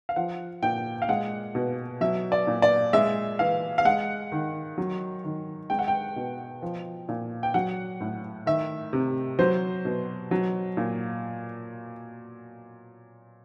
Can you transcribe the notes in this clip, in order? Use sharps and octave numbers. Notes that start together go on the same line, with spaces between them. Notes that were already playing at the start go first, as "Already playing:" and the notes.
F5
F3 F#5
A#2 G5
F5
G#3 F#5
B2
F#3 E5
D5
A#2
D5
G#3 E5
E3 F5
F5
G#3 F#5
D#3
F#3
D#3
G#3 G5
F#5
G5
B2
F3
A#2
G5
F#3 F#5
A2
D#3 E5
C3
F#3 C5
B2
F#3
A#2